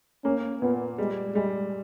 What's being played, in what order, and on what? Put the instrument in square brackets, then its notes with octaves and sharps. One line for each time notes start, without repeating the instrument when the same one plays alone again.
[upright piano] A#3 [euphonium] C#4
[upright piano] A#2 [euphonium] B3
[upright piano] G3 [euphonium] G#3
[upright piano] G3 [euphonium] G#3